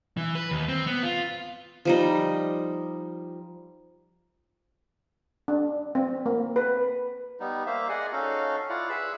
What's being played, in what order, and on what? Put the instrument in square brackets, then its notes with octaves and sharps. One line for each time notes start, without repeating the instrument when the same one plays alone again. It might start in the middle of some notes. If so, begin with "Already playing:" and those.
[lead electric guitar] E3
B4
D#2
C4
B3
F4
[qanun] F3 G3 D#4
[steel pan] D4
C4
A#3
B4
[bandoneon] G3 B3 D#4
A#3 C5 E5 F5
G#4 D5 D#5 F#5 G#5
C#4 D#4 F#4 A4 F5
E4 F4 D5 F5 F#5
G#4 B4 E5 B5 E6